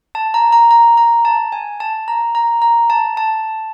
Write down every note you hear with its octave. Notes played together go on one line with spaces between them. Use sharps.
A5
A#5
A#5
A#5
A#5
A5
G#5
A5
A#5
A#5
A#5
A5
A5